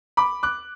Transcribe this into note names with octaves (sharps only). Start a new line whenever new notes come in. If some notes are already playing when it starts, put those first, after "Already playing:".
B5 D6
D6 F#6